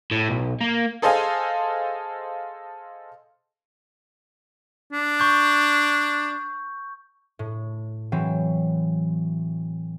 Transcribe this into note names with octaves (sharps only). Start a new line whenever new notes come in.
A2
B1
A#3
G#4 A4 C5 D#5 F5 G#5
D4
C#6 G6
A2
E3 F#3 C4